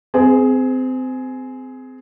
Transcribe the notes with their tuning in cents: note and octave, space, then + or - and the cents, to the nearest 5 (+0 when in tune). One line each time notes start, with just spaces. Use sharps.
C4 -25 G#4 +10